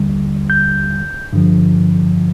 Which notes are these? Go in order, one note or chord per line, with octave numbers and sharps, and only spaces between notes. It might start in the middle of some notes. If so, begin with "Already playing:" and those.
Already playing: D#2 D3 G3
G6
G2 D3 F3